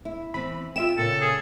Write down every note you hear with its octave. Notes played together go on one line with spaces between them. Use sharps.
E4
E3 C4 B5
F4 E5 G5 E7
A#2 C#3 A4
G#4